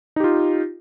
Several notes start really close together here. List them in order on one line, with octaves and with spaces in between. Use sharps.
D#4 G4 F4